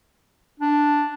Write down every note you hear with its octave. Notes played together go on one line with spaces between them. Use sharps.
D4